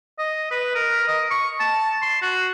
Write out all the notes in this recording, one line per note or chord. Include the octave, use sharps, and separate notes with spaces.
D#5
B4
A#4
D#5
C#6
A5
C6
F#4